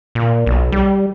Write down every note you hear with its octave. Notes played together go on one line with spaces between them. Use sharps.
A#2
B1
G3